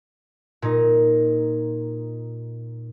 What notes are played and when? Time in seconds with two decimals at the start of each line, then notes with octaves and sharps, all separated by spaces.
0.62 A#2 D#4